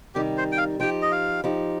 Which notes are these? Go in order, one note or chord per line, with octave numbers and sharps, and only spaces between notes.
C3 D#3 G3 D#4 G4
C5
G5
F5
F3 D#4 G4 G5
D#5
F5
F3 D#4 G4